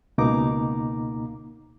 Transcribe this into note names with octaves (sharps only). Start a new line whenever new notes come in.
C#2 B2 A#3 D#4 A#5 D6